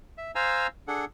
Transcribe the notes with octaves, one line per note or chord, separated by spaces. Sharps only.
E5
C5 F5 G#5 A#5 E6
D4 G#4 A4 F#5